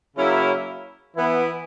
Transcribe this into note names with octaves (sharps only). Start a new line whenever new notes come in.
C#3 F#3 A#3 C#4 E4
E3 B3 E4